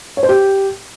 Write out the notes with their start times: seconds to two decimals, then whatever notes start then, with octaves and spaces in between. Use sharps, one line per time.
0.17 C#5
0.23 C5
0.29 G4